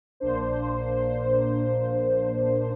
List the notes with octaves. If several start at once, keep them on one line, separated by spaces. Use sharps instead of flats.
A#1 A#3 D4 C5